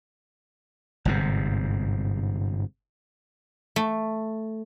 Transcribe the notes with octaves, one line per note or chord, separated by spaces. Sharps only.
G1 G#2 C3
A3